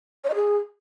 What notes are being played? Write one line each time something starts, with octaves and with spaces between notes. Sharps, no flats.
C#5
D#5
G#4